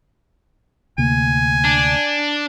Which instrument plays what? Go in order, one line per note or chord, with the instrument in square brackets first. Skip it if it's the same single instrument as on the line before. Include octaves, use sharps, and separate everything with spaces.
[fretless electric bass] D2 C3 A#3 [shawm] G#5
[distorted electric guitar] D4